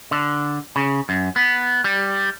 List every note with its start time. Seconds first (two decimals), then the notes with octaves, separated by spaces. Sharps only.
0.11 D3
0.76 C#3
1.09 F#2
1.36 B3
1.84 G3